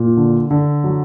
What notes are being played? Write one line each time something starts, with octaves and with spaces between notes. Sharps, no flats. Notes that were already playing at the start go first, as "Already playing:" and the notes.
Already playing: A#2
D3
D3
F#3